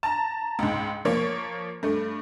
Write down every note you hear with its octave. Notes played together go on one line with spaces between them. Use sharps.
A5 A#5
C#2 G#2
F3 A#3 C#5
G2 A3